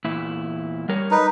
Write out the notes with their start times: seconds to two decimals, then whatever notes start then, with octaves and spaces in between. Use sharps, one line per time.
0.05 E2 A#2 E4
0.89 G3 A#4 C#5
1.11 D#4 B4